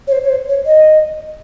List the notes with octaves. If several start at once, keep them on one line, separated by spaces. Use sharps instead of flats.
C#5
C5
C#5
C5
C#5
D#5